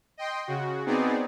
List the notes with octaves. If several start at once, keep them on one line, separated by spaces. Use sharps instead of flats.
D#5 G5 C6
C#3 F#4
B3 C4 D#4 G#4 D5